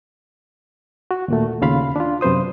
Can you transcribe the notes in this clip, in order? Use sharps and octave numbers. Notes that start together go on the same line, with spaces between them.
F#4
D#2 A#2 A3
D#2 C#3 F4 F5 B5
D4 F4
F#2 C3 B4 C5 D#6